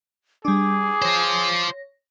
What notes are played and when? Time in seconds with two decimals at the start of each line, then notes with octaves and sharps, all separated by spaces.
0.45 G3 D4 G#4 D6
1.02 F4 C5 C#5 A#6